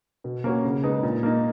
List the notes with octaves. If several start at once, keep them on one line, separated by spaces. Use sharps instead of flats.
B2
A#3 C#4 F#4
C#3
G#3 B3 D#4 G#4
A#2
A#3 D#4